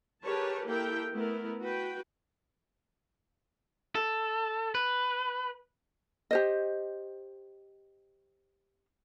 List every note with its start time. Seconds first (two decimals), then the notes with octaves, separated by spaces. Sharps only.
0.23 G4 G#4 A#4 B4 C#5 A5
0.67 A#3 E4 G4 A4 A#4 G5
1.12 A3 B3 E4 A#4
1.62 F#4 B4 G5
3.95 A4
4.75 B4
6.31 G4 C5 D#5